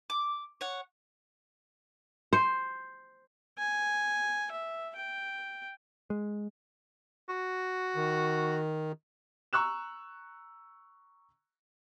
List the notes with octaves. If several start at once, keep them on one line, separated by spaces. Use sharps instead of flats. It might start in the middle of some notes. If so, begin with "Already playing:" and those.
D6
C#5 F#5
C5
G#5
E5
G5
G#3
F#4
D#3
A#5 C#6 E6 F#6 E7